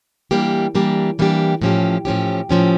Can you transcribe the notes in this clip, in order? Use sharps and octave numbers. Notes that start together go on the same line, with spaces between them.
E3 G3 A#3 D4 G4
E3 G3 A#3 D4 G4
E3 G3 A#3 D4 G4
A2 F3 C#4 G4
A2 F3 C#4 G4
A2 F3 C#4 G4